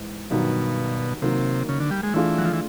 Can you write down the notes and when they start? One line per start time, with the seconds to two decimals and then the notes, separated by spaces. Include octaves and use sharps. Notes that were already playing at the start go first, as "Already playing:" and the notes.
Already playing: G#2 E3
0.30 G2 B2 D#3 F#3
1.22 C3 D#3 F#3 A#3
1.69 C#3
1.80 D3
1.91 G3
2.03 G#3
2.14 E3 A3 D4 F4 G#4
2.38 F#3
2.45 F3
2.53 E3